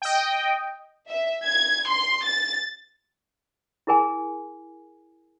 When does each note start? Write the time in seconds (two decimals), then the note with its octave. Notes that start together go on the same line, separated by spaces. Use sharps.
0.02 D#5 G5
1.09 E5
1.45 G#6
1.89 C6
2.26 A6
3.87 E4 G#4 A#4 G#5